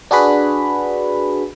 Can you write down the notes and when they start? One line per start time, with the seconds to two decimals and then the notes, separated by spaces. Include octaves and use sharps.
0.11 D4 F#4 G#4 B4 B5